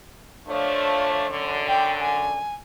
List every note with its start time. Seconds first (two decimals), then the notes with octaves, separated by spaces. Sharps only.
0.48 F3 A3 D4 C#5
1.29 F#2 D3
1.68 G5
2.01 G#5